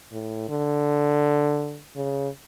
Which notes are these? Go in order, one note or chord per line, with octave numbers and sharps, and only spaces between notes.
A2
D3
C#3